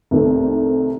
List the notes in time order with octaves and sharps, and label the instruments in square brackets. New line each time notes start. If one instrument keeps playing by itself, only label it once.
[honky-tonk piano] C2 C3 D#3 A3 C4